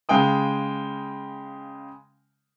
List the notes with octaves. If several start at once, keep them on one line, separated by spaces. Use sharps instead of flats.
C#3 G#3 F5 G5 D#6